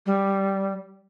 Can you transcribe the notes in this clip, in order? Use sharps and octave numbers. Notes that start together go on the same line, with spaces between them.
G3